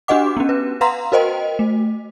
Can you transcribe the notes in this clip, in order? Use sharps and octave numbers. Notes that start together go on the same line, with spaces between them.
D4 F#4 G4 D#5 F#5 D6
B3 C#4
B4
B4 F5 F#5 A#5 C6
F#4 A#4 C5 D#5 G5
A3